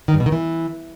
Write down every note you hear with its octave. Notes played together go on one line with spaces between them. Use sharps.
D#3
G2
B2
D#3
E3